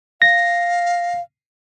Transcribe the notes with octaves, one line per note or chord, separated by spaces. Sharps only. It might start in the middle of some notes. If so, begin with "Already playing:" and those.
F5 A#6